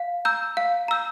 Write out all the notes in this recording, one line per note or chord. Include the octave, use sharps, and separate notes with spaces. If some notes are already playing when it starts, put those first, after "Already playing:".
Already playing: F5
A#5 E6 G6
F5
A#5 E6 G6